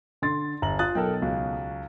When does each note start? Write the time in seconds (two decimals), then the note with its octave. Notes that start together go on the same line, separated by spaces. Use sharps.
0.22 D3 C6 A6
0.62 G1 A#5 F#7
0.79 F4 D#6 F#6 A6
0.95 B1 A4 A#4 G5
1.22 C#2 F#3